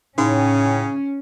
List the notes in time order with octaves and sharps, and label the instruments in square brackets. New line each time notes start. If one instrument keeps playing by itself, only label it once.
[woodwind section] A2 [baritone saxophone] C#3 [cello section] C#4 [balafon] D#4